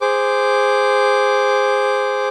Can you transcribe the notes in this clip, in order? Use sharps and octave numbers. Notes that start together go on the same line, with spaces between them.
G#4 C5 D6